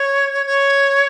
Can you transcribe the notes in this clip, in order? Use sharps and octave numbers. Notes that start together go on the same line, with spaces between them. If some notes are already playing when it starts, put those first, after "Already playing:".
Already playing: C#5
C#5